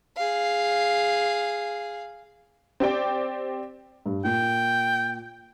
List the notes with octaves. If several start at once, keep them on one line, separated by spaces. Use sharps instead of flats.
G#4 F5
C4 G4 D5 G5
G2
A#2 G5